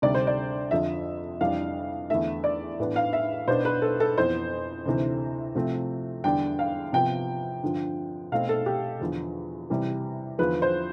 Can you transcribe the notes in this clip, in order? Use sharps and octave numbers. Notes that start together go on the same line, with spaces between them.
D2 C3 G3 D4 D5
C5
D5
F2 D3 F3 E5
F2 E3 G3 D4 F5
E2 D3 A3 E5
D5
A2 E3 B3 D4
F5
E5
B2 B3 D4 C5
B4
A4
A4
F2 E3 B3 C5
D2 C3 E3
C3 F3 A3 C4
E2 D3 G3 D4 G5
F5
C3 F3 B3 G5
G2 D3 F3
B2 A3 C4 F5
A4
G4
E2 D3 F3
C3 E3 G3
E2 D3 F3 B4
C5